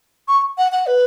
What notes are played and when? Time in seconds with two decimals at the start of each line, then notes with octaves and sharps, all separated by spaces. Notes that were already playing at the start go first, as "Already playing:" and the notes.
0.28 C#6
0.58 F#5
0.72 F#5
0.87 B4